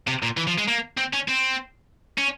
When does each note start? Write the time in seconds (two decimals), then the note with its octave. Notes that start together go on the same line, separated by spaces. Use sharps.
0.07 C3
0.23 A#2
0.37 E3
0.47 F3
0.58 G#3
0.68 A#3
0.97 C4
1.13 C#4
1.28 C4
2.18 C#4